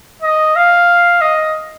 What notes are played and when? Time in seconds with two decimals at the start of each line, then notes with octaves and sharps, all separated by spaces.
0.22 D#5
0.56 F5
1.21 D#5